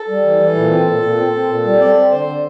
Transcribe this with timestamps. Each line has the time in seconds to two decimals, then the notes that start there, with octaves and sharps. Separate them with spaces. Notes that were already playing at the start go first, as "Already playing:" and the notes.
Already playing: A4
0.08 G3
0.24 E3
0.39 E3
0.55 A#2
0.71 C4
0.86 A#2
1.02 A#2
1.17 C4
1.33 C4
1.49 A#2
1.64 G3
1.80 C4 D5
1.95 C4
2.11 D3 C5
2.27 D3